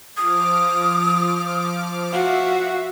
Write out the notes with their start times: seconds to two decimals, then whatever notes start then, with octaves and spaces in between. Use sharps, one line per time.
0.17 F3 D6 D#6 F6
2.12 F#4 E5 F5